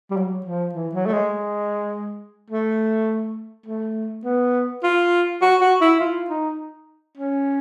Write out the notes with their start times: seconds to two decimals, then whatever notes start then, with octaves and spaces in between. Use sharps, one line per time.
0.11 G3
0.17 F#3
0.46 F3
0.74 E3
0.94 F#3
1.06 A3
1.13 G#3
2.50 A3
3.66 A3
4.25 B3
4.83 F4
5.41 F#4
5.61 F#4
5.81 E4
6.00 F4
6.30 D#4
7.17 C#4